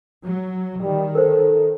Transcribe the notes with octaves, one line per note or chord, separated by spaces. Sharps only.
F#3
D#3 G3
A4 A#4 C5